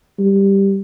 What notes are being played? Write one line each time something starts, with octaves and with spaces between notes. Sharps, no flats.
G3